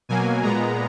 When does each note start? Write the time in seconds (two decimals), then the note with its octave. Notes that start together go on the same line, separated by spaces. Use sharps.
0.09 B2 F#3 A#3 G#5
0.43 A#2 G#3 B3 A#5